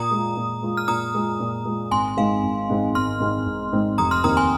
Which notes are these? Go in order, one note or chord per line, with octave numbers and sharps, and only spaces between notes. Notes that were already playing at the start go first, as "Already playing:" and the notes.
Already playing: A#2 A#5 D#6
G#3 F4
A#2
G#3 F4
F6
A#2 A#5 D#6
G#3 F4
A#2
G#3 F4
G#1 G#5 C6
G#2 G#3 C4 D#4 F5
G#1
G#2 G#3 C4 D#4
G#1 C6 F6
G#2 G#3 C4 D#4
G#1
G#2 G#3 C4 D#4
F1 A#5 D#6
C6 F6
D#2 D#3 C4 A#5 D#6
G#5 C6